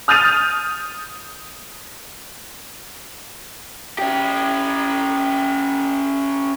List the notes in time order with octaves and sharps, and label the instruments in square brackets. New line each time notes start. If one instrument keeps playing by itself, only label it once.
[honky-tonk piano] D#6 F6 G6 A6 D#7 F7
[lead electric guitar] C#4 G4